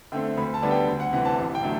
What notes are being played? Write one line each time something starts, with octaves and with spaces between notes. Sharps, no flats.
D3 A3 C4 G5
D2 B5
A5
D3 G3 B3 D4
G5
D2
F#5
C3 E3 F#5
A5
A1 A5
G5
D3 F#3 A3